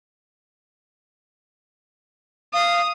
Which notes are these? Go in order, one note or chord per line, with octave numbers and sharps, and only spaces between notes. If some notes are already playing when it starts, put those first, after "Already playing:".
F5 D#6